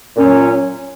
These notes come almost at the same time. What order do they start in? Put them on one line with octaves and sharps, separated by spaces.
A#2 C#4 F#3